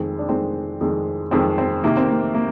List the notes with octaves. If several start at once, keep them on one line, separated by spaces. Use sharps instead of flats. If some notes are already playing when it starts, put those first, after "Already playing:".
Already playing: F2 D#3 G#3 C4
D4
F2 D#3 G#3 C4
F2 D#3 G#3
F2 D#3 G#3 C4
C4
C3 D#3 A#3
C4
A#3
A#3